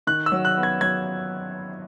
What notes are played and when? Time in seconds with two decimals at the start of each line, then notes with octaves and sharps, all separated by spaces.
0.07 D#3 F#6
0.26 E6
0.32 F#3
0.45 F#6
0.57 B3
0.63 G#6
0.81 F#3 G#6